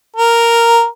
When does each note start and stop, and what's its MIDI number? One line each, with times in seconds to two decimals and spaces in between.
0.16 0.85 70